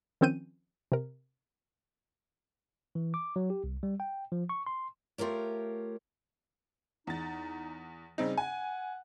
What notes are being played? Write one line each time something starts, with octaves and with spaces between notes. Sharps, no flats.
D#3 F3 C4 C#4 G6 D#7
C3 A#4
E3
D6
F#3
G4
C2
G3
G5
F3
C#6
C6
A3 F4 G4 A#4 C#5
E2 D#4 A6
C#3 G3 C4 D#4
F#5 G#5